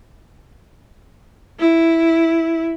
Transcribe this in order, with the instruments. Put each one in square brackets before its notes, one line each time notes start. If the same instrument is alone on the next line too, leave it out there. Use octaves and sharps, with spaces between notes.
[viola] E4